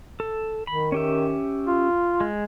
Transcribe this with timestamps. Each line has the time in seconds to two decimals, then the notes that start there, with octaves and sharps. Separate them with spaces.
0.20 A4
0.67 D#3 B5
0.92 C#4 G4 E5
1.67 F4
2.21 G#3